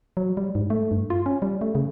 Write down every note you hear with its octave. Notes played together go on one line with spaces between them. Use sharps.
F#3
G3
G#2
A3
G2
F4
C#4
G3
A3
C#3